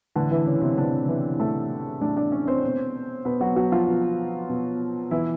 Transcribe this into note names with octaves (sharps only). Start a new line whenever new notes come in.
A2 D3 E3 D4
E3 E4
C#3 C#4
C3 C4
A2 D3 E3 D4
E3 E4
A2 E3 A3 A4
A2 E3 D4 D5
D4 D5
C#4 C#5
C4 C5
B2
B2 B3 B4
F#3 F#4
F#3 F#4
F3 F4
B2
B2
B2 E3 E4